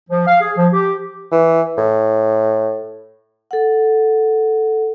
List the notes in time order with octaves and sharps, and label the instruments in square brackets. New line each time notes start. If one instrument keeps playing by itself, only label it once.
[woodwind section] F3
F5
G#4
F3
G4
[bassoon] E3
A2
[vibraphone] A4 F#5